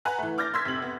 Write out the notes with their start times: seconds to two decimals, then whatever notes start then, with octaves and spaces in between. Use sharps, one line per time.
0.05 B4 F#5 G#5 A#5 F#6
0.18 E3 A3
0.38 D6 F6 G6 A6 A#6
0.54 C6 C#6 E6 G#6 B6
0.65 F1 C3 F#7
0.82 B3